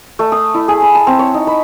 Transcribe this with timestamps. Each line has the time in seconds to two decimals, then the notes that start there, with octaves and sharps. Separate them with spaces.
0.19 A3
0.32 D#6
0.54 E4
0.68 G#4
0.82 B5
0.95 A5
1.07 C4
1.19 C#5
1.34 D#4
1.47 B5